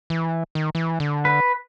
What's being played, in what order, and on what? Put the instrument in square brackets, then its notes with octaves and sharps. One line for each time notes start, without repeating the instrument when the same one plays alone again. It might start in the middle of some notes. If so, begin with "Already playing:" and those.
[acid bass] E3
D#3
E3
D3
[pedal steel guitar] B4